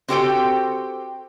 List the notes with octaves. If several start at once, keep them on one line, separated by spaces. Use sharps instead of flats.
C4 F#4 G4 A4 C5 G5